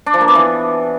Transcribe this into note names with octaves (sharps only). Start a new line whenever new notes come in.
D4
F3
A#3
B3
E3